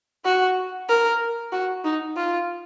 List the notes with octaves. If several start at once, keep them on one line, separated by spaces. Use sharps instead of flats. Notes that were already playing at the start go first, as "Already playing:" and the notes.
F#4
A#4
F#4
D#4
F4